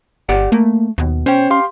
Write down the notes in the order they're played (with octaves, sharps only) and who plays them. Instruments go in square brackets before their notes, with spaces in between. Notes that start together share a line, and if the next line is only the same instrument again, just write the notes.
[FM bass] G1 [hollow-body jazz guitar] G4 D5 F#5
[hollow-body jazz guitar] A3 [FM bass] A#3
[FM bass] D#2 [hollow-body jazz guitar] B2
[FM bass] C#4 [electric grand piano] C5 C#5 G5
[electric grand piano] G4 F5 C6